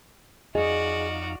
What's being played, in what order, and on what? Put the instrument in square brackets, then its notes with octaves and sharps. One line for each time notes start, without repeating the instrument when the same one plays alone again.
[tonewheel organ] F2 D#4 F5 [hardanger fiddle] F#4 D5 [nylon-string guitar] G#4 [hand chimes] D#5